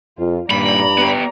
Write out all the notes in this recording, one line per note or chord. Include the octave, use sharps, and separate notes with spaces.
F2 F4
G2 A#2 G3 D5 A#5 B5
B3 G4